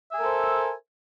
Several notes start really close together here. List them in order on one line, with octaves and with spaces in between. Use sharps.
E5 G#5 A#4 A4 C5